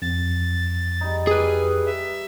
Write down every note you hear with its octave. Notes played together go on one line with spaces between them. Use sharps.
F2 A6
G3 D#4
G#4 B4 G#5
E5